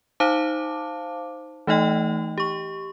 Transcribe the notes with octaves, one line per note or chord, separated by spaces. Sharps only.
D#4 C5 F5 A5 D6
E3 A3 D#4 D#5 G5
G4 C#6